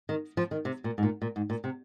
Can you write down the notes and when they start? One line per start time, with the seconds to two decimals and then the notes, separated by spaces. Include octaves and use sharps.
0.09 D#3
0.37 F3
0.51 D#3
0.65 C3
0.84 A#2
0.98 G#2
1.03 A#2
1.22 A#2
1.36 G#2
1.50 A#2
1.64 C3